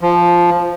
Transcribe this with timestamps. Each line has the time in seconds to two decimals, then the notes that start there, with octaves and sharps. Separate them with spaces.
0.01 F3